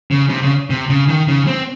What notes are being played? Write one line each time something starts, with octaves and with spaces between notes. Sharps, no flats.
C#3
C3
C#3
C3
C#3
D#3
C#3
C4